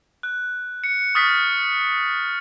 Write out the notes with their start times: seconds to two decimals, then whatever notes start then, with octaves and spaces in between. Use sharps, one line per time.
0.23 F#6
0.84 C#7
1.15 C#6 D#6 F6 A6 B6